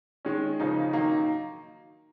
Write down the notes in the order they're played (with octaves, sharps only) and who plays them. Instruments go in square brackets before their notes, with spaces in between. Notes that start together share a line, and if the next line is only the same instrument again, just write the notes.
[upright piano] D#3 G#3 C#4
C#3 F3 A#3 D#4
D#3 F#3 A#3 D#4